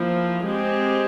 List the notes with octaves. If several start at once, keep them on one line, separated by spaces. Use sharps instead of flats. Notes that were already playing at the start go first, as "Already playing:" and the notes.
Already playing: F3 A#3 E4
G#3 C4 G4